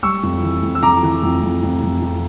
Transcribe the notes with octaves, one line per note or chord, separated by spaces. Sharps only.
G3 C#6 E6
F2
E3
F2
E6
F2 A#5 D6
E3
F2
F2
F2
F2
F2